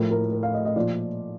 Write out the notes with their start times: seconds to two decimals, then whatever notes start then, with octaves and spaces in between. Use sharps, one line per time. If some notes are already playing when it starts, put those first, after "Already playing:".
Already playing: A2 F3 A#4
0.11 A#4
0.33 A#4
0.43 F5
0.54 D#5
0.65 D#5
0.76 A#2 F3 D5